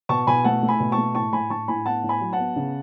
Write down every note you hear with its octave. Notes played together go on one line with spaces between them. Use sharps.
B2 A5 C#6
B2 G#5 B5
A3 F#5 A5
A3
G#5 B5
B2
A5 C#6
A3
A2 A5 C#6
A2 G#5 B5
A2 A5 C#6
A2 G#5 B5
B3 F#5 A5
A2
G#5 B5
F#3
F#5 A5
B3
C#3